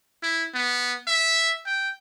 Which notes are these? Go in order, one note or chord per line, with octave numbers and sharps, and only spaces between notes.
E4
B3
E5
G5